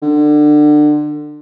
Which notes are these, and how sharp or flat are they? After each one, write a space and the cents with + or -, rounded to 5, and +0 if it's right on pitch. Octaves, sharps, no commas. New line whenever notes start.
D3 +25